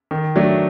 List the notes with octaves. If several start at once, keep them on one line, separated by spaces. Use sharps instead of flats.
D#3
F#3 A3 D4